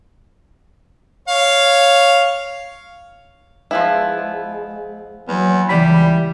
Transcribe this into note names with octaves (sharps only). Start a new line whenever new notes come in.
C#5 F5
F3 G#3 B3 E4
E2 F#3 A#3
C#2 E3 G3 D5 B5